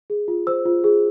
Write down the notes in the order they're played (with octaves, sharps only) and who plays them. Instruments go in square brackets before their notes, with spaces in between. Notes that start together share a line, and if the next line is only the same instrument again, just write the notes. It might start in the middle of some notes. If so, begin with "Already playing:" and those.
[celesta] G#4
F4
C5 E6
F4
G#4